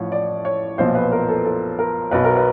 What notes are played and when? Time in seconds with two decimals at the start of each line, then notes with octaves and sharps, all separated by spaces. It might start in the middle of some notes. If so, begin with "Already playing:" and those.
Already playing: A1 A2 F3 C#5
0.12 D5
0.45 C#5
0.78 B1 A#2 F3 C5
0.95 B4
1.12 A#4
1.29 A4
1.45 A4
1.79 A#4
2.11 B1 B2 B4
2.24 A#4
2.36 B4